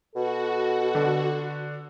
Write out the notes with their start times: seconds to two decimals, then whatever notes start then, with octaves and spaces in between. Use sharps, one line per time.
0.16 B2 F#4 A4
0.95 D3